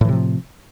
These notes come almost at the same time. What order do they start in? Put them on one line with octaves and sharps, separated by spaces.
A2 E3 C3 F3